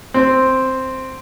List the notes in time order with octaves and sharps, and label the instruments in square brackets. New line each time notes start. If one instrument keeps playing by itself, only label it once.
[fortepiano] C4